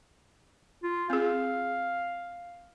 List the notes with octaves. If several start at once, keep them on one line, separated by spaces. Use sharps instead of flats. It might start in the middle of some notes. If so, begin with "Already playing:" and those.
F4
C4 G#4 F5